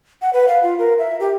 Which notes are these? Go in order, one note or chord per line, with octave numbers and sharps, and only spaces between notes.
F#5
B4
F5
F4
A#4
E5
G4